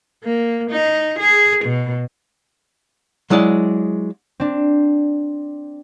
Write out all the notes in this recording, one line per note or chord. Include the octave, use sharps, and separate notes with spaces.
A#3
D#4
G#4
B2
F#3 G#3 E4 G#4 D5
C4 D4